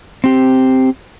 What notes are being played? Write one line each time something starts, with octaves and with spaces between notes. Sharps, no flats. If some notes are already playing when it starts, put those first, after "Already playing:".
C4 G4